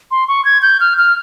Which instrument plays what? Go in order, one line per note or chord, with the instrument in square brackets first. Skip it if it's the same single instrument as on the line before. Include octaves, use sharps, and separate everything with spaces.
[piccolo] C6
C#6
G#6
G6
F6
F6